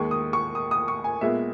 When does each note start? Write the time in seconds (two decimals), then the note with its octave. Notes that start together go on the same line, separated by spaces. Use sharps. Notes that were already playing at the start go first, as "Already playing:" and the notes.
Already playing: D#2 D#3 G#3 C#6
0.11 D#6
0.33 C#6
0.55 D#6
0.71 D#6
0.88 C#6
1.04 G#5
1.21 A#2 G#3 B3 E5